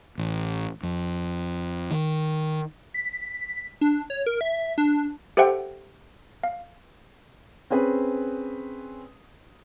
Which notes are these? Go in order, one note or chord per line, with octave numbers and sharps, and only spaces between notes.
A1
F2
D#3
B6
D4
C#5
A#4
E5
D4
G4 A4 C5 E5 F#5 G5
F5
C4 C#4 G#4 B4